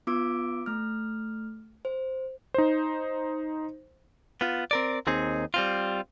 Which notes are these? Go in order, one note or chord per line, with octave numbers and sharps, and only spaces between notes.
B3 F4 D6 E6 D7
A3 F6
C5
D#4 C5
B3 F4
C4 A#4 D5
D#2 C4 D#4 G#4
G3 C4 F4